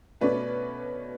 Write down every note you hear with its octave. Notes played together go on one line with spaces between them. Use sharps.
B2 A3 C#4 B4 D5